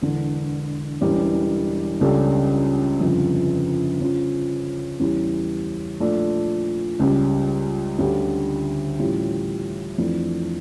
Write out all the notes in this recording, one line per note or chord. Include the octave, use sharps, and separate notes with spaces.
E1 E2 D3
E1 E2 E3 G3 C#4
C#2 C#3 G3 D4 A4
G1 F2 C#3 F3
C#3 F3 C#4 F4
E2 E3 G3 C#4
A#2 F3 A3 D4 F4
C#2 C#3 G3
D2 D3 G3 C#4 G4
A2 E3 G3 C#4 F4
F2 E3 A3 D4